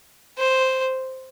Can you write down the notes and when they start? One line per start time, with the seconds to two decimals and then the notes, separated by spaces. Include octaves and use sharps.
0.38 C5